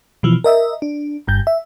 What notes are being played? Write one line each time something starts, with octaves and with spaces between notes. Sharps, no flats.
B2 E3 F3
A#4 D#5 E5
D4
G1 G2 G6
E5